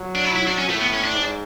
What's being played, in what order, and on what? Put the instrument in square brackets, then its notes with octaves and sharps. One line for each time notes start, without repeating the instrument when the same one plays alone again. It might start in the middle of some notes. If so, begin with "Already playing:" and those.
Already playing: [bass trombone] F#3
[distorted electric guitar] D4
E4
E4
D4
C#4
[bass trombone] A2 [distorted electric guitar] A3
[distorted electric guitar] B3
C#4
D4
[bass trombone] G#2